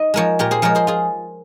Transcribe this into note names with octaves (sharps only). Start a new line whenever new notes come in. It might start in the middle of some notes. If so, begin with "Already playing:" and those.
Already playing: D#4 D#5
F3 G#3 A#4 C#5
A#2 G4 A#4
G#4 C5
F3 G#3 A#4 C#5
G#4 C5
F4 G#4